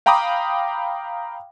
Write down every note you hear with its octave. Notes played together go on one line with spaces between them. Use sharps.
F5 G5 A#5 B5 D6 D#6